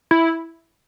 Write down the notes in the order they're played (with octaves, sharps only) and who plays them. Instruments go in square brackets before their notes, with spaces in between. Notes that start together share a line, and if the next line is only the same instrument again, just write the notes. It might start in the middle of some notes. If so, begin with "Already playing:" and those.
[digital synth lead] E4